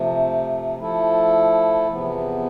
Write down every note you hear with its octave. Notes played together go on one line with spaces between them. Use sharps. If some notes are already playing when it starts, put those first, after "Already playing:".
Already playing: C3 F3 A3
F3 A3 E4 A4
E2 C3 F3 B3